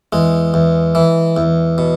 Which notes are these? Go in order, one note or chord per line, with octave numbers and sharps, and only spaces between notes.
E2 G#3
E2
E3
E2
B2